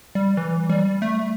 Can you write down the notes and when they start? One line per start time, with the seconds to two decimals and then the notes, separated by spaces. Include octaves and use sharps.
0.15 G3
0.37 E3
0.70 G3
1.02 A3